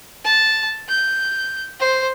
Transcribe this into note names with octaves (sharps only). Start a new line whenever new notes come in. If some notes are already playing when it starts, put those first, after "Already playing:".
A5
G6
C5